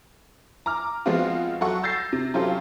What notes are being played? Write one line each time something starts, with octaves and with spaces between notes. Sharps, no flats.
A#5 D6 F6
F3 G#3 B3 C4 F4 F#4
F#3 A4 F#5 C#6
E6 G6 A6 A#6 C7
C3
F#3 C#4 F4 G4 A4 C5